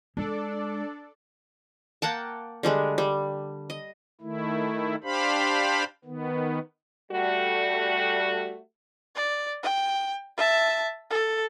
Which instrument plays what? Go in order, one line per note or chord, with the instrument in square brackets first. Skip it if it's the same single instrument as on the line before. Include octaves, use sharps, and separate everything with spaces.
[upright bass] G#3 [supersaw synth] D4 A4 D5
[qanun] A#3 F#5 G5 A5
D3 G3 G#3 D4
G3
D#5
[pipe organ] D#3 A3 E4
D4 G4 C5 F5 B5
D#3 B3
[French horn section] G3 A3 F#4
[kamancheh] D5
G5
E5 A5
A4